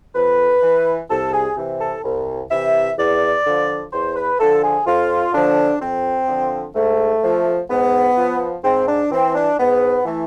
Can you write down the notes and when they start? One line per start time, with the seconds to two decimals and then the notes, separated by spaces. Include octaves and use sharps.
0.15 F2 B4
0.62 E3
1.09 C2 A4
1.33 G#4
1.56 C3 E3
1.80 A4
2.04 C2
2.51 C3 E3 E5
2.97 E2 D5
3.46 D3 F3
3.92 E2 C5
4.16 B4
4.39 D3 F3 A4
4.63 G#4
4.87 F2 F4
5.34 D3 F3 D4
5.81 F2 C4
6.28 D3 F3
6.75 G#2 A3
7.22 F3
7.70 G#2 B3
8.16 F3
8.64 G#2 C4
8.88 D4
9.11 E3 C4
9.35 D4
9.59 G#2 B3
10.05 E3 A3